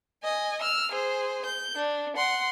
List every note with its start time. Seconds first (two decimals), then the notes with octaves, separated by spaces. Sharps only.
0.24 D#5 G#5
0.62 E6 F6
0.92 G#4 C5
1.46 G6
1.76 D4
2.17 F#5 C6